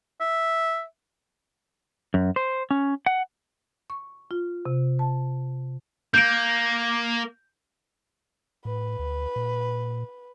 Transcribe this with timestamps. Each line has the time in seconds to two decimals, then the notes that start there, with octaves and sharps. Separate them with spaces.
0.20 E5
2.14 F#2
2.36 C5
2.71 C#4
3.06 F#5
3.90 C#6
4.31 F4
4.66 C3
4.99 A5
6.14 A#3 G6 D7
8.65 A2 B4
8.99 D2
9.36 A#2